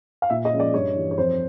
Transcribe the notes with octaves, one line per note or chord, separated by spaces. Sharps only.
F5
A#2 E5
D#5
F3 G#3 C#4
D5
G2 C#5
E3 G3
C#5
F2 C5